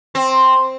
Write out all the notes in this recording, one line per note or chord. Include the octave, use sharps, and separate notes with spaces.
C4